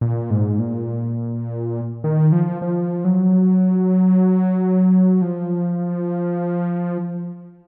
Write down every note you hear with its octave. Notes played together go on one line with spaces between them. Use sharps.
A#2
G#2
A#2
D#3
F3
F3
F#3
F3